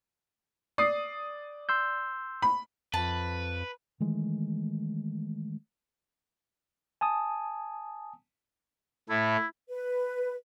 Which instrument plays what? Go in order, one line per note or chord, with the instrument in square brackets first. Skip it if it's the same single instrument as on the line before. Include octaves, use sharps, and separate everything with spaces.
[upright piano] D5 D#6 C7
[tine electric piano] C6 E6 G6
[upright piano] B5
[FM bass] F2 [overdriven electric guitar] B4 [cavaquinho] A5
[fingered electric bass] D#3 E3 G#3 A3
[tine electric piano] G#5 A5 D#6
[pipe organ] A2 A3 [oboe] E4
[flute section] B4